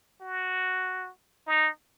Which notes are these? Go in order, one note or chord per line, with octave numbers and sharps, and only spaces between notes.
F#4
D#4